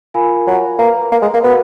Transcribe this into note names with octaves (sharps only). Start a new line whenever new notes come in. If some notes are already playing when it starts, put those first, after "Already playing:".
F4 A#4 F5 G#5 B5
F#3
A#3 B4 F5 A#5
A#3
G#3
A#3
B3 F#4 A#4 F5